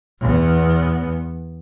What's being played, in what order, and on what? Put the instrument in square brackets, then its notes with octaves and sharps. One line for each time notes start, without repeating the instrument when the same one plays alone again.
[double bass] E2 B3